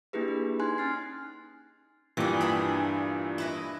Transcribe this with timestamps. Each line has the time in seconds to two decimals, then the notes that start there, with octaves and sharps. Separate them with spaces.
0.13 A#3 D4 E4 G4 G#4 B4
0.28 D4
0.60 D#4 G#5 C6 F#6 G#6
0.78 C#4 F6 A6 C7
2.17 G2 A#2 E3 G4 G#4
2.41 D4 G#4 B5
3.38 E4 B4 D#5